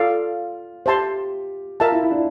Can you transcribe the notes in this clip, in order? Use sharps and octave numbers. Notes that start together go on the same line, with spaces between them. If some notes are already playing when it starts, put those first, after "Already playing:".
Already playing: F4 A4 D5 F5
G4 C5 E5 A5 C6
F4 A#4 E5 A5
E4
E4
D4
E4